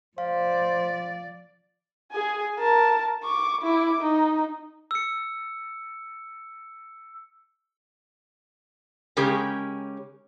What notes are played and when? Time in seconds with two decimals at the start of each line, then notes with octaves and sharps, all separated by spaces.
0.18 F3 C5 D5 F5
2.12 G#4 G#5
2.59 A#4 A5
3.23 C#6 D6
3.61 E4 D6
4.01 D#4
4.91 E6 C#7
9.17 C#3 G#3 C#4 G4 G#4 A#4